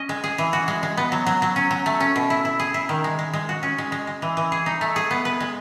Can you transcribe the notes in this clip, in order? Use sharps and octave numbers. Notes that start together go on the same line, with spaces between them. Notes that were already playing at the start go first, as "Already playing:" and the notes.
Already playing: C#4 D#5
G#3
G#4
E3
F#4
G#3
G#3
B3
F#3
F#3
F#3
C#4
F#3
A3
C#4
B2
E4
E4
G#4
E4
D#3
G#3
G#3
G#3
F#4
C#4
G#3
G#3
G#3
E3
E3
G#4
D#4
A3
G#4
B3
B4
G#3